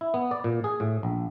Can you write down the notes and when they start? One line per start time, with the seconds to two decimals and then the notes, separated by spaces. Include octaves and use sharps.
0.01 E4
0.14 B3
0.31 D5
0.44 A#2
0.64 G#4
0.80 A2
1.03 A#1